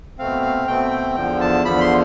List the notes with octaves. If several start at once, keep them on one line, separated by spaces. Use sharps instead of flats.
B2 A3 C4 F5
F5
B2 A3 C4 G5
G5
E2 D3 F3 G5
A5
E2 D3 F3 B5
C6